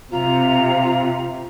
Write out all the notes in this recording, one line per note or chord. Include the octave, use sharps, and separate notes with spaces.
C3 F4 A#5